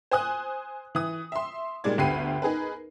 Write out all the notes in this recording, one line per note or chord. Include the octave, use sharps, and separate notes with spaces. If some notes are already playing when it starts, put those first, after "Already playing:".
C5 G#5 D#6 F#6
E3 D#6
E5 C6
A#2 G3 G#3 D#4 D5 G#6
G1 D2 G4 B5 C7 D#7
D#4 G#4 A#4 B4